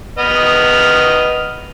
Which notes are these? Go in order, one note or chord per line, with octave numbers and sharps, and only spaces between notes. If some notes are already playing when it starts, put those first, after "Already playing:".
B3 D#5 F6